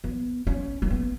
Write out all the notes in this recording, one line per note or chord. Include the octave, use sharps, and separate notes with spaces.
B3
C#4
A#3
B3